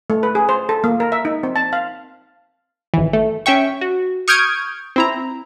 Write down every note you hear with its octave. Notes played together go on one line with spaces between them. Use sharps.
A3
B4
G#4
C5
A4
A#3
A#4
E5
D#4
C4
A5
F5
G#1 E3
A3
C#4 E5 G5 C#6
F#4
C#6 D#6 F6 G6 G#6 D7
C4 E4 A#5